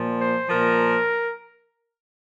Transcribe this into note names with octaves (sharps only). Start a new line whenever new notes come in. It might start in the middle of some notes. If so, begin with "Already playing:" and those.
Already playing: A#2 F3
C5
A#2 F3 A#4